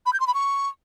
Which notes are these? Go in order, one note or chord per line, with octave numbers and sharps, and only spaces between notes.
B5
G6
C6
B5
C#6